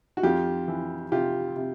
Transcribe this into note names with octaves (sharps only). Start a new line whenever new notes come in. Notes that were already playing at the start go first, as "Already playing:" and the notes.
F#4
F2 F4 G4
E3
C3 F4 G4
C3